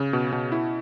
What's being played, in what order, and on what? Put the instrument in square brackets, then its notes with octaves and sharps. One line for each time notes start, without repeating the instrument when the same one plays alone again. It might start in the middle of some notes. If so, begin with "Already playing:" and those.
Already playing: [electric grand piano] C#3
B2
B2
E4